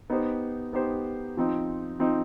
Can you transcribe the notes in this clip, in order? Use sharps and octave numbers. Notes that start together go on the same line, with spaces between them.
B3 D#4 G4 C5
B3 D#4 G4 C5
F3 C4 D#4
F3 C4 D#4